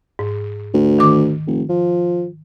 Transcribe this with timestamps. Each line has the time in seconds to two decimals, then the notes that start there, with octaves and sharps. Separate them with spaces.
0.19 G#2
0.74 D2
0.99 D#3 D6
1.47 F1
1.69 F3